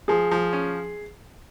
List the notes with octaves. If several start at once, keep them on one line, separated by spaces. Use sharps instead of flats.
F3 G#4
F3
C#4